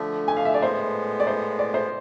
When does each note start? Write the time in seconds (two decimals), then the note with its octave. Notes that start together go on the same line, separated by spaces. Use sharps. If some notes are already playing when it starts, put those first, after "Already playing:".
Already playing: D3 F3 A3
0.28 G#5
0.37 F5
0.45 E5
0.54 D5
0.62 A2 G#3 B3 C5
1.20 D5
1.27 C5
1.59 D5
1.74 C5